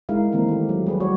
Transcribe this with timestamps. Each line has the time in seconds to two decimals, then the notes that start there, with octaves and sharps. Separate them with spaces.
0.09 G#3 D#4 E4 A#4 F5
0.32 D#3 E3 A#3 C4 A#4
0.48 A3 G4
0.69 F#3
0.86 G3 G#4 B4
1.00 A3 F#4 C#5 D5